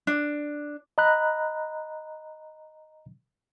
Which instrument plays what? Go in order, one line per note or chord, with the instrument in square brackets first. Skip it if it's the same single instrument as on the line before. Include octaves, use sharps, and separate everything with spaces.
[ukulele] D4
[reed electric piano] D#5 A#5 B5 F#6